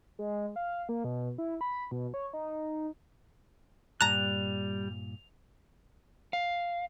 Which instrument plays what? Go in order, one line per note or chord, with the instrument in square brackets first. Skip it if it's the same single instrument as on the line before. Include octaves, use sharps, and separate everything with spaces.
[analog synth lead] G#3
F5
A#3
B2
E4
B5
B2
C#5
D#4
[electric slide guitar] G2 A#2 [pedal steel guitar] G3 F#6 [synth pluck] A5 A#5 [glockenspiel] F7
[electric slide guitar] F5